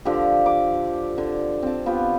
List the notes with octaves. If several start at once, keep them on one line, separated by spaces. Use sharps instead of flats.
D3 F3 G4
D6
D3
C4 A5
B3 F4 G4